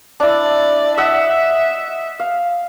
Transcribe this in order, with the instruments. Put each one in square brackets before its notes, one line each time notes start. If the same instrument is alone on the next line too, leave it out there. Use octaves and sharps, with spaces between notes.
[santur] D4 E4 [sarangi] D5
[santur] D#5 F#5 E6 [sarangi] E5
[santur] F5